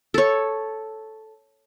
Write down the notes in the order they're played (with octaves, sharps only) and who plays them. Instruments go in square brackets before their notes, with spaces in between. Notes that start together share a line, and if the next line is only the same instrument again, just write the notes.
[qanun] A4 C#5